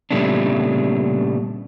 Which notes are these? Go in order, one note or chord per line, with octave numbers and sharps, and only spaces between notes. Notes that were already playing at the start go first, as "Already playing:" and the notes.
A#2 C#3 G3 A3 B3 D4